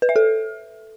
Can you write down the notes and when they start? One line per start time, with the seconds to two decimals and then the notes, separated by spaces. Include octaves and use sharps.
0.02 B4
0.09 E5
0.16 A4